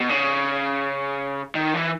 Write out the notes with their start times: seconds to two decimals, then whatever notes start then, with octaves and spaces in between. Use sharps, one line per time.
0.01 B2
0.10 C#3
1.55 D#3
1.74 E3